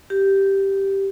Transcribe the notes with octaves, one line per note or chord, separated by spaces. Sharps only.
G4